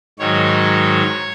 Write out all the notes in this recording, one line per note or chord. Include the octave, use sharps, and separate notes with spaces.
G#2 D#3 F#3 C#5